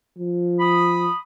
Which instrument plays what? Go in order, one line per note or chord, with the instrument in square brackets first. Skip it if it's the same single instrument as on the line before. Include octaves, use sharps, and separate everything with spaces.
[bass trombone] F3
[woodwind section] B5 D#6